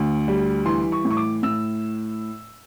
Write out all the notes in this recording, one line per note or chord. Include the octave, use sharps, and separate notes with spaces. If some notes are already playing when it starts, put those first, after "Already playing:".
Already playing: D2
G3
E3 C6
C#6
A2
C#6
D6
A2 E6